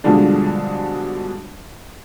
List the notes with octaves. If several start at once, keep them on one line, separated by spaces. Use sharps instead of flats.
G2 B2 D3 F3 G#3 D4